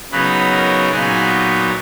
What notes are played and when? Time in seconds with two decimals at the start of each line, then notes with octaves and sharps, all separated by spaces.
0.11 C#3 F#3 B3 D#4 B4
0.51 A#4
0.91 A#2 F#3 B3 D#4 G#4